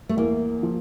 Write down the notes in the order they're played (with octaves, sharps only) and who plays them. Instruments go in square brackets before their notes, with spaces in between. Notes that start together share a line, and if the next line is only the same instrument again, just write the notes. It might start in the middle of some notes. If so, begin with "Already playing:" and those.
[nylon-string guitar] A3
[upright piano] E2 [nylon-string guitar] A#3
[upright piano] F3